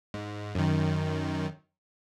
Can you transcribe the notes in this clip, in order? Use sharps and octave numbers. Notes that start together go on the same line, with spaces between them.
G#2
F#2 D#3